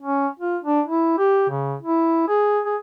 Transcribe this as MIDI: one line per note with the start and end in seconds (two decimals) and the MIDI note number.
0.02 0.28 61
0.39 0.57 65
0.64 0.81 62
0.86 1.13 64
1.18 1.46 67
1.50 1.75 49
1.82 2.26 64
2.28 2.60 68
2.65 2.76 68